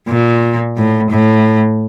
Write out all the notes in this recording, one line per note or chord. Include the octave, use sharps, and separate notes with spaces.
A#2
A2
A2